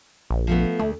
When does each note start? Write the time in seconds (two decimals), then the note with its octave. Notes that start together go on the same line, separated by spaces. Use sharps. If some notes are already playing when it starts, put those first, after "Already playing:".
0.30 A#1
0.47 F3 A3 B3
0.79 D2 A3